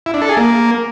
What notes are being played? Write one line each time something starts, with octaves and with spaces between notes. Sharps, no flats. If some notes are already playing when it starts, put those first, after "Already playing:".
E4
D4
A4
G#4
A#3